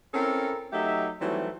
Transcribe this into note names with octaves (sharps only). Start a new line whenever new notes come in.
C4 C#4 E4 A4 A#4
F#3 A3 D#4 G4 E5
D#3 E3 F#3 G3 A3 C4